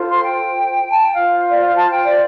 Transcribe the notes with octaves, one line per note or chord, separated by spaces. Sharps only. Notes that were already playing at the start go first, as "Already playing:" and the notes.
Already playing: F4 A4 C5
C6
G5
A5
G5
F4 C5 F5
D5
F5
A5
G5
D5